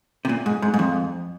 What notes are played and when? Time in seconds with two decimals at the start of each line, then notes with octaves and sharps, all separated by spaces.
0.25 C3
0.29 A#2
0.46 G#2
0.62 G#2
0.74 G#2
0.79 F2